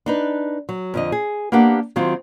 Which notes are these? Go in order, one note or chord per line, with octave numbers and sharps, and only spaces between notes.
D4 D#4 B4
F#3
F2 D3 D#5
G#4
A#3 B3 D4 G4 A#4 F#5
D#3 F#3 C4 E4 F4 C#5